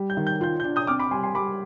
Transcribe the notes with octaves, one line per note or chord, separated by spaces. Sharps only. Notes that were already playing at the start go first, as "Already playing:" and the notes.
Already playing: G3
G6
D#3
G6
F4 G6
G6
D4
D#6 G6
C4 D6 F6
B5 D6
G3 G#5 C6
G#5 C6
G3 B5 D6